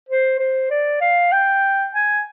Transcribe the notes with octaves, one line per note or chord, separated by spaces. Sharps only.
C5
C5
D5
F5
G5
G#5